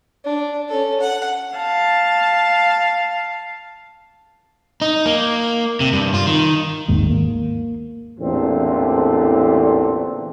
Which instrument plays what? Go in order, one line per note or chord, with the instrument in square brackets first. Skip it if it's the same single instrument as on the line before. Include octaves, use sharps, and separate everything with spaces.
[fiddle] D4
C#4 A4
F#5
[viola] F5 A5
[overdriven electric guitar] D#4
A#3
C3
G2
F4
D#3
[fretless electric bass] G#1 D#2 G#2
A#3
[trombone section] A1 E2 A#2 D3 A3 C4